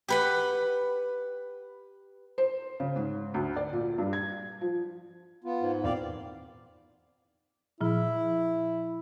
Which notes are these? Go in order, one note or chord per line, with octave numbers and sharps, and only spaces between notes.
G4 B4 F#5
C5
C#3
G#2
D2
D5
A#2
G2
G#6
F3
B3 F4
G#2
E2 A#2 C4 D5 F5
A#2 F3 E4